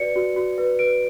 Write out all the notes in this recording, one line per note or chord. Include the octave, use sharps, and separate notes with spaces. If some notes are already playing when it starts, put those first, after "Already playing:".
Already playing: F#4 B4 D5 C#7
F#4
F#4
B4
B4 D7